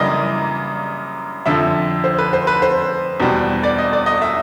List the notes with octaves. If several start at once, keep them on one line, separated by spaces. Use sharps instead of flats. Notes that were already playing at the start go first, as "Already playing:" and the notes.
Already playing: F#2 C#3 E3 G3 A#3 D5 D#5
F2 D3 F3 E5
C5
B4
C5
B4
C5
E2 B2 G3
D5
D#5
D5
D#5
E5